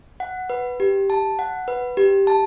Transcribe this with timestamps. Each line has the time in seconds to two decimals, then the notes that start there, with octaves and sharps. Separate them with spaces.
0.20 F#5
0.50 B4
0.80 G4
1.10 A5
1.39 F#5
1.68 B4
1.97 G4
2.27 A5